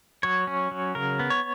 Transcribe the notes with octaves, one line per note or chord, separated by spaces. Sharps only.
F#3 C#5
C#4
F#3
C#3 A#4
B3
C#5